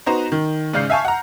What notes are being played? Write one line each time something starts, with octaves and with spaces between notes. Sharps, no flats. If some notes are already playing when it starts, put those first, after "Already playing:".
B3 D#4 F#4 C5 A#5
D#3
G#2 C#3 D5 F6 G6 C7
E5 F5 G#5 A5 C#6
F#5 A#5